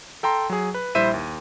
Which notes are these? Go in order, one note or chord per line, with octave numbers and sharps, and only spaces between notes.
A4 G5 A#5 C6
F#3 G#4
B4
A#1 G3 E4 C5 E5 D#7
D#2